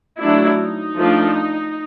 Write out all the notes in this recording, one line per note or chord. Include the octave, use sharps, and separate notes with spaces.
F#3 A3 D4 E4
D#4
F3 A3 D4